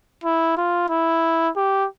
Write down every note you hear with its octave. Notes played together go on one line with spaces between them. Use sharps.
E4
F4
E4
G4